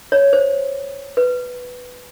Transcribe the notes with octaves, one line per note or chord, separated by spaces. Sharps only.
C#5
C5
B4